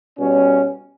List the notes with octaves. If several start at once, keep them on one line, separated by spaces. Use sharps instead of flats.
B2 G3 C#4